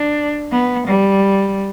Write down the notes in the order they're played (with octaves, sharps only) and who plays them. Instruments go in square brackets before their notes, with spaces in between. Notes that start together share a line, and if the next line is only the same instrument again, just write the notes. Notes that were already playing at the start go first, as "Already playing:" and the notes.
Already playing: [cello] D4
B3
G3